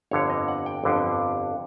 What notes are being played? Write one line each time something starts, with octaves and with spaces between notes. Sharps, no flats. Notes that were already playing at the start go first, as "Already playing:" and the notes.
G1 F2 D3 C#5
D#5
F#5
G5
G1 F2 D3